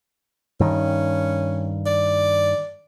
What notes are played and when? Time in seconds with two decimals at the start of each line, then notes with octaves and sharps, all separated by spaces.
0.60 G2 D#3 C#4
1.86 D5